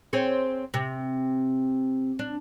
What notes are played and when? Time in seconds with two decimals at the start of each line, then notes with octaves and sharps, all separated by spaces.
0.13 C4 G#4 C#5
0.74 C3
2.19 D4